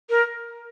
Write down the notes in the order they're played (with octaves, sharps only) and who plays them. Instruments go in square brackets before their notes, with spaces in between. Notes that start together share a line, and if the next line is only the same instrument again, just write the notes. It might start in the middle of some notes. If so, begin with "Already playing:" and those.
[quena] A#4